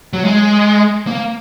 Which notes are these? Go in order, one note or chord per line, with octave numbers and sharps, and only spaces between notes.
F#3
G#3
A#3